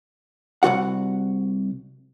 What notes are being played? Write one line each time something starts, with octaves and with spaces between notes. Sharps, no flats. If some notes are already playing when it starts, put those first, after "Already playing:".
C2 F3 F#4 F#5